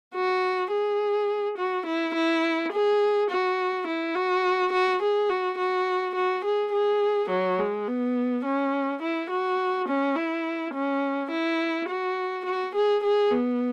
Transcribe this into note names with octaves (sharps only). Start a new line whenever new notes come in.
F#4
G#4
F#4
E4
E4
G#4
F#4
E4
F#4
F#4
G#4
F#4
F#4
F#4
G#4
G#4
F#3
G#3
B3
C#4
E4
F#4
C#4
E4
C#4
E4
F#4
F#4
G#4
G#4
B3